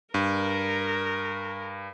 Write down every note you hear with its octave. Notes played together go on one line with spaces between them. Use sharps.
G2 A#4